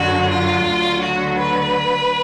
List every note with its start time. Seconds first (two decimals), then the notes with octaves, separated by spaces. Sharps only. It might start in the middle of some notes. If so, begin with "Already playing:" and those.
Already playing: F#2 D3 F#3 F#4
0.29 F4
0.67 D2 D3 F#3
1.02 F#4
1.39 B4